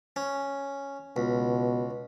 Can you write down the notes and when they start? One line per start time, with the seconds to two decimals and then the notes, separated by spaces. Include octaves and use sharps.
0.16 C#4
1.16 C#2 B2